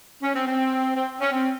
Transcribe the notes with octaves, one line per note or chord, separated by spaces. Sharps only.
C#4
C4
C4
C4
C#4
C4